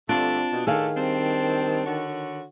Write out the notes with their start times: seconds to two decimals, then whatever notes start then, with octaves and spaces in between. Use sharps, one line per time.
0.09 G2 D3 A3 C4 D4 F4
0.53 B2
0.67 A2 D#3 D4 G#4 A4 F5
0.97 G3 C4 D4
1.86 D3 F#4 C#5